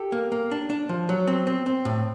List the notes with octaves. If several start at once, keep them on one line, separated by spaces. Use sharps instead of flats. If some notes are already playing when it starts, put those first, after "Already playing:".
Already playing: G4 A4
A#3
A#3
D4
D4
F3
F#3
C4
C4
C4
A2